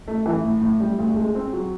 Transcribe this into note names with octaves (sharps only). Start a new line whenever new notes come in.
A3
E3
A2
A2
G3
D2
G#3
C4
F#3